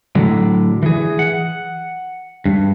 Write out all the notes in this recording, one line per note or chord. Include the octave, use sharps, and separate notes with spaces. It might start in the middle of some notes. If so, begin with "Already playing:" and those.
A2 D3 F#3
E3 G#4
F#5
G2